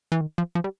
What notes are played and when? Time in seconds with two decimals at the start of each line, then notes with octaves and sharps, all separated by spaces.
0.12 E3
0.21 D#3
0.38 F3
0.55 F3
0.64 G3